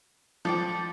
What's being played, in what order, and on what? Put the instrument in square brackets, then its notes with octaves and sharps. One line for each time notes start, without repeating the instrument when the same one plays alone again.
[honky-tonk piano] F3 [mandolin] A4 D5 G5